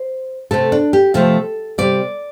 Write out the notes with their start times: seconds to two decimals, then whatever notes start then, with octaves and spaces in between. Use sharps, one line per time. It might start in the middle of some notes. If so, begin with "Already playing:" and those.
Already playing: C5
0.51 C3 A3 A4
0.72 D4
0.93 G4
1.14 C3 F3 A3 A4
1.78 C3 G3 D5